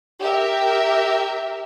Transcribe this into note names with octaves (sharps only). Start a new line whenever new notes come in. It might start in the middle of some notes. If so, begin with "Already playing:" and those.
G4 A#4 E5